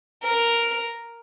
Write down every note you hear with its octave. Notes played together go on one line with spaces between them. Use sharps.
A#4